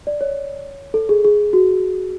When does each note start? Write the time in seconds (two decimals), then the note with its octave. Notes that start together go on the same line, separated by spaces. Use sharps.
0.07 D5
0.21 C#5
0.94 A4
1.09 G#4
1.24 G#4
1.53 F#4